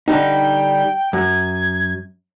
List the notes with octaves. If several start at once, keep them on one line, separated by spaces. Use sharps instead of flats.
D3 G3 D#4 G5
F#2 G#6